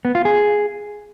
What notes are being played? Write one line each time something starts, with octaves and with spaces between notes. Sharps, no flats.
B3
F4
G#4